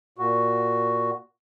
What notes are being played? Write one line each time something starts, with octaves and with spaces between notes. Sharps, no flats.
A#2 F#4